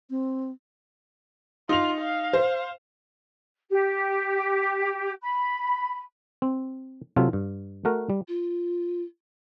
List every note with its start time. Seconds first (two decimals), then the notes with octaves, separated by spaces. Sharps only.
0.10 C4
1.69 D#4 F4 F7
2.01 F5
2.33 C5
3.70 G4
5.22 B5
6.42 C4
7.16 C3 F#3 F4 A4
7.33 G2
7.85 A3 F#4 A#4
8.10 G3
8.28 F4